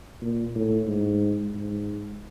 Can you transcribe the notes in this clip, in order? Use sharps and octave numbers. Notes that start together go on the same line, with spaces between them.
A#2
A2
G#2
G#2